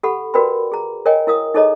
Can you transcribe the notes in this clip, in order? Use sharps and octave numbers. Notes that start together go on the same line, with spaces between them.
G4 A4 F#5 B5
F#4 A#4 B4 D5 G5 B5
G#4 A#5
A#4 C#5 D#5 G5 G#5
E4 A#4 F5 D#6
D#4 G#4 A4 C#5 D#5 A#5